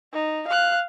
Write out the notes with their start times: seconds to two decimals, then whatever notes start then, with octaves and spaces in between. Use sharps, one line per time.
0.13 D#4
0.48 F5 F#6